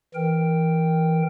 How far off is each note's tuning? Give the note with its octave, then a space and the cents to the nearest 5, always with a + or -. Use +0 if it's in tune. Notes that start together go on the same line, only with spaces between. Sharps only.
E3 +0 A#4 +0 G5 +0